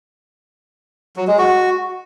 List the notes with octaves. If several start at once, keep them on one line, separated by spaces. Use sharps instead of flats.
F#3
G#3
F#4